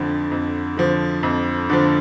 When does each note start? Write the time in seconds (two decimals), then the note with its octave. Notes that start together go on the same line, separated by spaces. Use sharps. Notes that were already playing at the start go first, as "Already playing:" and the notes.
Already playing: F2 D3 F3
0.31 F2
0.77 D3 F3
1.23 F2
1.70 D3 F3